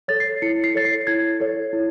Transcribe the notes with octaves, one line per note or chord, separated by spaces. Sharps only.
A4 C#5 A6
C7
E4 C#7
C7
A4 C#5 A6
C7
E4 G#6
A4 C#5
E4